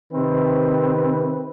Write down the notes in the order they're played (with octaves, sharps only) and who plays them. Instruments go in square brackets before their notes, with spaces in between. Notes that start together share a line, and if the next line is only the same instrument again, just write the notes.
[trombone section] C3 D#3 C4 B4